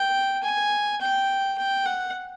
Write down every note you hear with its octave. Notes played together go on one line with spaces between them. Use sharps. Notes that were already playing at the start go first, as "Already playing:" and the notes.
Already playing: G5
G#5
G5
G5
F#5